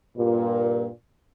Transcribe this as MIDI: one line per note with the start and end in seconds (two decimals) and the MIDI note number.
0.16 0.86 43
0.16 0.86 46